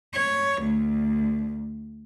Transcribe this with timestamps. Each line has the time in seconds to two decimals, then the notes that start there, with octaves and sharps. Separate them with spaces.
0.13 C#5
0.64 D2